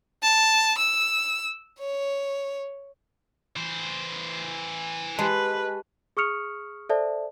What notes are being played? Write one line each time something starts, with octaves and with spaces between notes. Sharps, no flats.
A5
E6
C#5
E3 C5
G#3 G4 B4 A5
G#4 C#6 D#6 F6 C#7 F7
A4 C5 D5 E5 A5